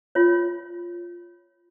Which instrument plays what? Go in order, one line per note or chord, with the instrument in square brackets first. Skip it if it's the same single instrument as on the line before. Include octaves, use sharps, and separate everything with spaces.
[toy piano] F4 C#5